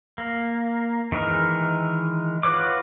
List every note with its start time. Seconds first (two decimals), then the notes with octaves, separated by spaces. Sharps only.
0.18 A#3
1.12 D#3 E3 G#3 A#4
2.43 F4 F#4 B4 C#5 D6